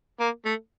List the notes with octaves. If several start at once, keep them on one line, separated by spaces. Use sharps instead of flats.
A#3
A3